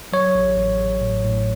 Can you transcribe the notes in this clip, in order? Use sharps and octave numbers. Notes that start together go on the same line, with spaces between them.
F#3 C#5
A1
A1
A1
A2
A2